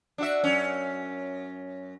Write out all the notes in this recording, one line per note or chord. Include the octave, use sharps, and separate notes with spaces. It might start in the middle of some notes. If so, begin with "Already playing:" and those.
D4 F#4 E5
F#2 C#4